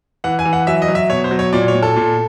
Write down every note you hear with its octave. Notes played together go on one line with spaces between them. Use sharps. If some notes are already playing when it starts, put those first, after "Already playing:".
E3 F#5
G#5
E3
F#5
F#3 E5
D#5
F#3
E5
B2 C#5
C5
F#3
C#5
A#2 D5
C#5
A#2
A4
A#2